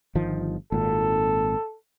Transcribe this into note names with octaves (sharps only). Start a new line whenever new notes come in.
G1 D#3 F3
G#1 A#2 A4